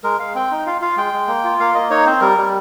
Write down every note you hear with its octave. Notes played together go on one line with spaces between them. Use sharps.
G#3 A#4
G#3 F5
C4 G5
D#4
F4 F5
F4 F5
G#3 G5
G#3
A#3
F4
A#3 F5
A#3 D#5
D#4 C#5
C4 C5
G3 A#4
G3